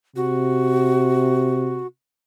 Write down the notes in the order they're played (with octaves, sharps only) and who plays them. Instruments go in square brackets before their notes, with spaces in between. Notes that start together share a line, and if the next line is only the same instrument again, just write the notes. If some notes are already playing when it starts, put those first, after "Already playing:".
[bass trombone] C3 [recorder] F#4